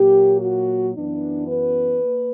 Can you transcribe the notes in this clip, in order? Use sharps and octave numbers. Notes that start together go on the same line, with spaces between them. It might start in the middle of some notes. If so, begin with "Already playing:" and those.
Already playing: A#2 F#3 A#3 G4
F#4
F#2 E3 B3 D4
B4
A#3